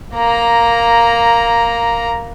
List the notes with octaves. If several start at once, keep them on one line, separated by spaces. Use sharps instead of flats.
A#3 A#5